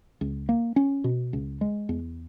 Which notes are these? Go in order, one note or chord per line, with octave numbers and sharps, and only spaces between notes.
C#2
A#3
C#4
B2
C#2
G#3
E2